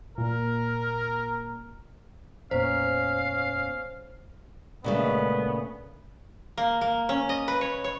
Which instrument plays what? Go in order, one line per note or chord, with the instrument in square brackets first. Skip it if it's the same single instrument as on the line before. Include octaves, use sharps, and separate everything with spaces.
[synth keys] A#2 [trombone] A#4
[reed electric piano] F2 A#2 B3 [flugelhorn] C#4 [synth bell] C5 [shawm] F5
[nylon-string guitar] A#2 C#3 A3 [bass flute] G#3 [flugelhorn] B3
[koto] A#3
A#3
C#4
D#5
B4
C#5
C#5